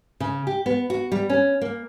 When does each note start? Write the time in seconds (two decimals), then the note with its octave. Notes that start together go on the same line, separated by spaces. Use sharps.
0.20 C#3
0.47 G4
0.66 B3
0.90 F#4
1.12 G3
1.30 C#4
1.61 A#3